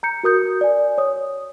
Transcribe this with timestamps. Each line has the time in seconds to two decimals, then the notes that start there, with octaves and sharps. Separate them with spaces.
0.03 A#5 G6 C#7
0.23 F#4 A#4 D#6 G6
0.61 D5 G#5
0.98 C#5 D#6